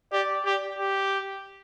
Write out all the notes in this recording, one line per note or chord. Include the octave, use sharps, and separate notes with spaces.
G4 D5
G4
G4